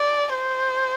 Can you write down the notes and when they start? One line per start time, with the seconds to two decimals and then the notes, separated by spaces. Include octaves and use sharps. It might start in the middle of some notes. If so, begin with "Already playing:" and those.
Already playing: D5
0.35 C5